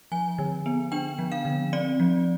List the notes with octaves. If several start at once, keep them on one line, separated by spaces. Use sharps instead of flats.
F3 G#5
D3
B3
D4 G5
F3
F5
D3
C4 D5
F3